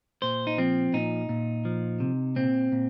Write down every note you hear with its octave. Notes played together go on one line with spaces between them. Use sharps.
A#2 C5
D#4
F3 C4
A#2 D#4
A#2
F3
C3
A#2 C4
A#2